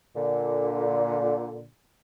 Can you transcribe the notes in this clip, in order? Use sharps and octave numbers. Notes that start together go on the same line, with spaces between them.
A#2 D3